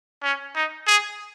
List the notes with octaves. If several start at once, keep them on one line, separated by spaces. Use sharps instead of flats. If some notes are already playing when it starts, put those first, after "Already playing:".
C#4
D#4
G#4